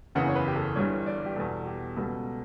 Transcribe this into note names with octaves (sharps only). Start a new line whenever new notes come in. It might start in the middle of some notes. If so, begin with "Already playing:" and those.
F#1 E2 C#3 E3 F#5
C#5
B4
G4
A4
G1 G2 E3 G3 C#5
D5
G4
E2 B2 G3 A4
G4
C#2 B2 G3 A4